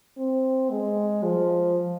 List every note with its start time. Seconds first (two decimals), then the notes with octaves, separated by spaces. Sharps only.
0.18 C4
0.71 G#3
1.23 F3